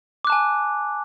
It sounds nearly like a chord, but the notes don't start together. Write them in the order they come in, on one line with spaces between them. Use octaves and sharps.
D6 F#6 A5 G#5